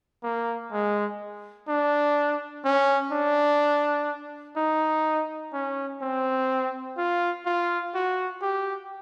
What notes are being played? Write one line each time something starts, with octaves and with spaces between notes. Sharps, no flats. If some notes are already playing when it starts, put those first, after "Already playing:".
A#3
G#3
D4
C#4
D4
D#4
C#4
C4
F4
F4
F#4
G4